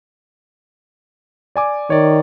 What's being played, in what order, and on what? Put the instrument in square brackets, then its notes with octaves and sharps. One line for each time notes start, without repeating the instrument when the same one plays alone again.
[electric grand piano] D5 G#5 D6
[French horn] D#3 [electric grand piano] C#5 D5